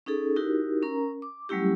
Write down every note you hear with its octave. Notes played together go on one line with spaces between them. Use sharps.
C#4 D#4 G#4 A4
D#4 E4 F#4 G4 A#4
C#4 A#4 A#5
D6
F#3 G3 A3 C#4 E4 G4